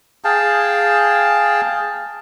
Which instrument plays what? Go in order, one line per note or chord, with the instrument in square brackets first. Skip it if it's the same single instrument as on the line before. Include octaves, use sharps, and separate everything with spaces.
[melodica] G#4 F5 G5 A5